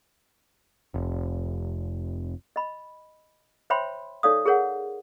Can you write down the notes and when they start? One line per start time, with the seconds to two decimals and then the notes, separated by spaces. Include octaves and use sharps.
0.94 F1
2.56 D#5 B5
3.70 C5 C#5 E5 G5 B5 C6
4.23 D#4 A4 C#5 D5 F5 D#6
4.46 G#4 A#4 C#5 F#5